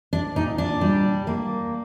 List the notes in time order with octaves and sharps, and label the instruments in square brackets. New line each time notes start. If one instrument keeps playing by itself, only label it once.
[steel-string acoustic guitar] D4
A#2 D#4
D4
G3
A#3